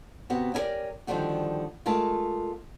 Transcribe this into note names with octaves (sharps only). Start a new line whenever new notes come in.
C3 B3 F#4
C#4 E4 G4 G#4 A#4 D5
D3 D#3 F3 G3 A3 F#4
G#3 A3 F4 A#4 A5